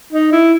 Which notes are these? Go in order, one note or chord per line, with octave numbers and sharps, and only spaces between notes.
D#4
E4